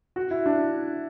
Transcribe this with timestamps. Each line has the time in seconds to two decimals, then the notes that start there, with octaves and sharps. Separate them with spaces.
0.16 F#4
0.31 E4
0.46 D4